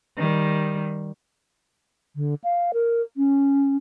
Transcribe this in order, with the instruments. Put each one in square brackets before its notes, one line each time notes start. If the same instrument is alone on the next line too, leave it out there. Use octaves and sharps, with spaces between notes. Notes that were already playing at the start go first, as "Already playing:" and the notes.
[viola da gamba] D#3 G3
[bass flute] D3
F5
A#4
C#4